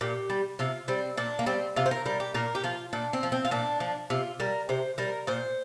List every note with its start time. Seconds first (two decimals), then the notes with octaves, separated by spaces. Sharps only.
0.01 A#2 G4
0.30 G3
0.59 C3 F4
0.88 G3 C4
1.17 A#2 D4
1.39 A#3
1.46 G3 C4
1.76 C3 F4
1.86 C5
1.91 A#4
2.06 G3 A#4
2.20 G4
2.34 A#2 A#4
2.55 G4
2.64 F3 F4
2.93 A#2 D4
3.13 C4
3.23 F3
3.32 C4
3.45 F4
3.51 A#2 D4
3.80 F3
4.10 C3 F4
4.40 G3 A#4
4.69 C3 C5
4.98 G3 A#4
5.27 A#2 C5